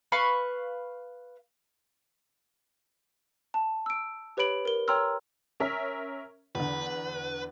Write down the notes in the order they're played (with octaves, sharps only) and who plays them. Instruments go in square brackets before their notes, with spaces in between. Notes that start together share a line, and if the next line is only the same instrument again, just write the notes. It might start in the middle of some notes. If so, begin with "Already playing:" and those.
[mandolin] B4 F5 B5 C#6
[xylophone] A5
E6 D7
G4 B4 C#5 B5 D7 F#7
A#4 G7
C#5 G5 A#5 C6 E6 F6
[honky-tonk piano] C#4 A#4 E5
[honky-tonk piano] E2 D3 [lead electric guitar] B4